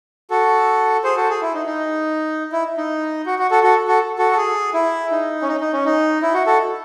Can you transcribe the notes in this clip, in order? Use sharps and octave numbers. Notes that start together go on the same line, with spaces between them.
F#4 A4
G#4 C5
F#4 A4
G#4
E4
D#4
D#4
E4
D#4
F#4
F#4
F#4 A4
F#4 A4
F#4 A4
F#4 A4
A4
G#4
E4
D#4
C#4
D#4
D#4
C#4
D#4
E4
F#4
F#4 A4